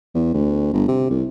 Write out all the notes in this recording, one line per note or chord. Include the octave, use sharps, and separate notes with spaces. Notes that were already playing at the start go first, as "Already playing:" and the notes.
E2
D2
G1
C3
C2